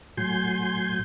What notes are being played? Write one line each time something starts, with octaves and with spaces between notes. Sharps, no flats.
A2 F#3 G#5 C6 G6